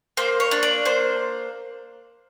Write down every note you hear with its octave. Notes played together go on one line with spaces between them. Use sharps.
A#3 C5
C#5
D4
D5
A#3 C5